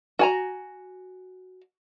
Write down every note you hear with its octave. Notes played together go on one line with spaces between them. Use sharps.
F#4 G#5 A#5